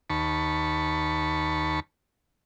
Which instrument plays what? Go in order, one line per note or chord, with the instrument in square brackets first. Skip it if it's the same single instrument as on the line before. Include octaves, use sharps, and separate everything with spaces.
[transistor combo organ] D#2 A5 B5 C#6